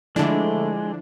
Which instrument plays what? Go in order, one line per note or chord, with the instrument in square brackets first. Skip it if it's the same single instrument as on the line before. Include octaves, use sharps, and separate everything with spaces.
[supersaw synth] D3 D4 [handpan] F3 E4 [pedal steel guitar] G#3 [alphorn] A3